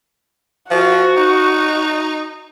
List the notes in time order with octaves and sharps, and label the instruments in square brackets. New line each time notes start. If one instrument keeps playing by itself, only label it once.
[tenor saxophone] F3 [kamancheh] F#4
[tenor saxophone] D#4